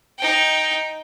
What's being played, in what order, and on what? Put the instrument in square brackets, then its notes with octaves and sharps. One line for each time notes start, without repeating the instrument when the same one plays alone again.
[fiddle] D#4 G5